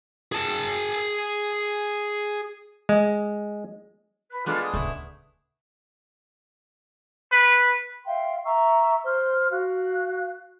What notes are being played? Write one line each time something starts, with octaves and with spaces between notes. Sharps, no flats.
G#4 A5
G#3
B4 F#6
G#3 B3 D4 F4 A4
D#6
D1 C#3 A3 E4
B4
E5 F5 G5 C6
E5 A#5 C#6 E6
C5 C6 F6
F#4 F5 F#6